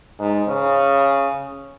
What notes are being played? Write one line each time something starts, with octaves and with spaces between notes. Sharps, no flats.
G#2
C#3